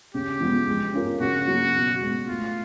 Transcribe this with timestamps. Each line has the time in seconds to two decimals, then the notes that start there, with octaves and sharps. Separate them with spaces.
0.14 C#3 G4
0.40 F3 G#3 B3
0.68 G#3
0.94 C#4 F4 A#4
1.20 C#3 F#4
1.47 F#3 A#3
1.74 B2
2.01 G#3 B3
2.27 A2 F4